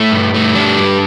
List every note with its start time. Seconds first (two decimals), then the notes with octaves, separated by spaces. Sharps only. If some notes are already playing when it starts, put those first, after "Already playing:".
Already playing: A3 E4
0.12 G2
0.34 A3
0.55 G3 D4
0.79 G2